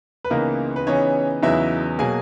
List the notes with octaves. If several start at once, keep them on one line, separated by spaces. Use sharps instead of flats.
B4
C#2 C#3 E3 A#3 B3 D#4 A#4
B4
C#3 E3 B3 C#4 D#4 C#5
E2 C#3 F#3 B3 D#4 E4 E5
B2 F#3 A#3 G#4 G#5